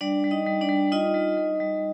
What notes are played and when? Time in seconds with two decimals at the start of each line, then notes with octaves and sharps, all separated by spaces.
0.01 G3 D4 D5
0.24 G3
0.31 D#4 D#5
0.46 G3
0.61 D4 D5
0.69 G3
0.92 D#4 F4 D#5
1.14 G3
1.37 G3
1.60 G3